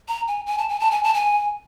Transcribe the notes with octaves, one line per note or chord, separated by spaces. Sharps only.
A#5
G#5
G#5
A5
G#5
A5
G#5
A5
G#5